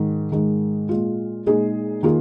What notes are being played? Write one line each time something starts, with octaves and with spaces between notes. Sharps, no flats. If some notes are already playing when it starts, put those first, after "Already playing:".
Already playing: G#2 D#3 G#3
G#2 D#3 G#3 D#4
A#2 G#3 F4
A#2 G#3 D#4 G#4
D#3 A#3 F4 G#4